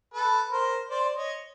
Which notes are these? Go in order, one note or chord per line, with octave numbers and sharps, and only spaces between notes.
A4 B4
A#4 C5
C5 D5
C#5 D#5